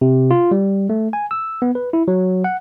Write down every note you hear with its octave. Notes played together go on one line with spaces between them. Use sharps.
C3
F4
G3
A3
G#5
E6
B3
B4
E4
F#3
F#5